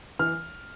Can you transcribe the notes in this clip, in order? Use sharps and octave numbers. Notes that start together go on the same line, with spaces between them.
E3 F6